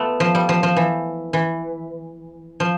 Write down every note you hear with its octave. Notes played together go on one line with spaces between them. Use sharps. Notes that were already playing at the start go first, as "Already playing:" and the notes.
Already playing: A3 B3 F4
F3
G3
F3
F3
E3
E3
F3